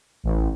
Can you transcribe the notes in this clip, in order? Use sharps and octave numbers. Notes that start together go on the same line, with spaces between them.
A1